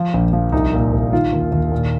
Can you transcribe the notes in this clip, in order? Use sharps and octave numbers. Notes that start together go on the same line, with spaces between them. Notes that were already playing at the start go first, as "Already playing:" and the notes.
Already playing: F3
A#1
F3
C2 D#4
A#2
C2
D#3 F4
D#2
D#2
A#2